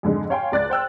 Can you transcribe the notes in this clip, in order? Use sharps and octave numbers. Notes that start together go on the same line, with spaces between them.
F2 G#2 D3 G#3
C#5 F5 G5 G#5 C6
C#2 D5 F#6 A6
C5 G5 E6 F#6